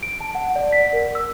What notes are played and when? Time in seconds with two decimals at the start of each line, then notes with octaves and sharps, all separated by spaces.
0.03 D7
0.21 A5
0.35 F#5
0.56 D5
0.72 B6
0.93 A#4
1.15 E6